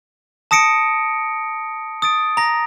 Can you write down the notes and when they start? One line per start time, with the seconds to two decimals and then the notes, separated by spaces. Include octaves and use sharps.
0.51 A5 D#6 A#6 C#7 D7
2.02 D#6 A6 D7
2.37 A#5 A#6